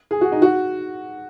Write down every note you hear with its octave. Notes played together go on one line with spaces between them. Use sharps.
G#4
F#4
D#4
F#4